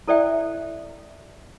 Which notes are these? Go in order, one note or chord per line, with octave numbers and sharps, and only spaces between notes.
E4 A4 C5 D5 E5 G5